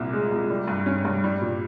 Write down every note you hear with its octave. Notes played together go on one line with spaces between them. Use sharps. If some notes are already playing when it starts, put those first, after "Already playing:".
Already playing: C2 A#2
G#3
C2
G3
G2
C#4
G2
G3
A#2